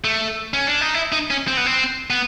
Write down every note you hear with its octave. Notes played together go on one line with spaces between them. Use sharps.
A3
C#4
D4
D#4
E4
D#4
C#4
C4
B3
C4
B3